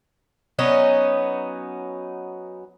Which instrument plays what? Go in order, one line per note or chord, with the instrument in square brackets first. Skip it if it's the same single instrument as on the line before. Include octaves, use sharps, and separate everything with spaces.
[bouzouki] F#3 B3 C#4 D#4